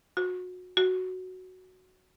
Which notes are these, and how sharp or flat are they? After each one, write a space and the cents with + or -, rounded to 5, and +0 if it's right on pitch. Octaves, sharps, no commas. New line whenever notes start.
F#4 -25
F#4 +0